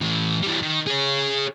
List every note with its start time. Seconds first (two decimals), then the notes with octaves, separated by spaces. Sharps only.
0.01 A2 E3
0.43 E3 G3
0.62 D#3
0.87 G#4 C#5